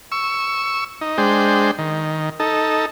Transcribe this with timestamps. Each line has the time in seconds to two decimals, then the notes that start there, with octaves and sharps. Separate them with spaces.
0.12 C#6 E6
1.01 D#4
1.18 G#3 D4 C5 G5
1.78 D#3
2.40 D#4 A4